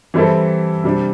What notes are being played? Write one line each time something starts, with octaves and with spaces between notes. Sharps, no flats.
E3 G3 C4 E4 A4
C3 G3 D4